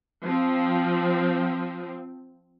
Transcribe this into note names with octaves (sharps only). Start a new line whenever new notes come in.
F3 C4